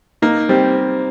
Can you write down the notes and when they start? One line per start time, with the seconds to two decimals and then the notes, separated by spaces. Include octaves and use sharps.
0.22 A#3 D#4
0.49 G3 C4